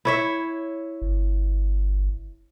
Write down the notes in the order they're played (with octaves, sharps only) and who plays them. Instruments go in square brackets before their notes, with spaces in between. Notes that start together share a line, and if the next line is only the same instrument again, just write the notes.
[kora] E4 C#5 E5
[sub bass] G1